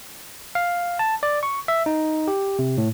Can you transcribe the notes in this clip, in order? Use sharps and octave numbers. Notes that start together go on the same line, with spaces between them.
F5
A5
D5
C#6
E5
D#4
G4
C3
A2